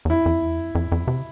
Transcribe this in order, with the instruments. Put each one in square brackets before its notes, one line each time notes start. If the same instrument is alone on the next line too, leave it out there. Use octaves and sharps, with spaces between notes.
[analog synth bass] E2
[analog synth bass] F2 [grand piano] E4
[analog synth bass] F2
E2
F2
F2
F2
C3